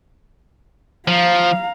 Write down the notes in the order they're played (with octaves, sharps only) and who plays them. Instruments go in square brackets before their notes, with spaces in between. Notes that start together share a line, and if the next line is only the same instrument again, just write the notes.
[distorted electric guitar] F3 [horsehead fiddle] F5 A#5